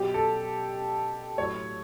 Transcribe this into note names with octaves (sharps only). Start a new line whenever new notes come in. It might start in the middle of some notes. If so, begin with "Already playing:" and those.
Already playing: B2 F#3 G4
A4
A2 F#3 C#5